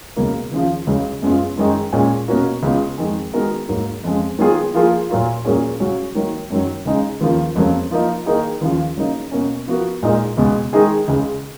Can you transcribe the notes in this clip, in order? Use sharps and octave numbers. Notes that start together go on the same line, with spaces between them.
C#2 B2 F#3 A#3
D#2 C#3 F3
C#2 C#3 F#3 C#4
F#2 C#3 G#3 B3 F4
F#2 D#3 G#3 D#4
A#2 G#3 C#4
B2 A#3 C#4 F#4 A#4
C#2 C#3 G#3 B3 F4
F2 D#3 G#3
D#3 G#3 B3 F#4 A#4
G#2 F#3 A#3
F2 C#3 G#3
D#3 F#3 B3 F4 G#4
F3 A#3 F4 G#4
A#2 F#3 A#3 F4
A#2 F#3 A#3 C#4 G#4
C#3 F#3 C#4 F#4
D#3 F#3 A#3
F#2 D#3 F#3
C#2 C#3 G#3 D#4
D#2 C#3 F3 A#3
F2 C#3 F#3 A#3
F3 A#3 D#4
D#3 A#3 D#4 G#4
D#2 C#3 F3
C#3 F#3 A#3 D#4
B2 A#3 C#4
F3 B3 F#4 A#4
A#2 G#3 D#4 A#4
C#2 B2 G#3
D#3 G#3 D#4 G#4
C#2 C#3 G#3